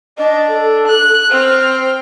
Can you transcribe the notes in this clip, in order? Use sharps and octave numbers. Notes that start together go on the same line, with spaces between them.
D4 D#5
A4
F#6
C4 C5 F6